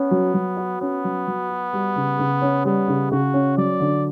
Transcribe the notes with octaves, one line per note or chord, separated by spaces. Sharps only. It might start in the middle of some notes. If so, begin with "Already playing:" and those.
Already playing: B3 C#4
F#3
F#3
F#4
B3 C#4
F#3
F#3
F#4
G3
C#3
C#3
C#4
G3 B3
C#3
C#3 F#4
C#4
F#3 D5
D3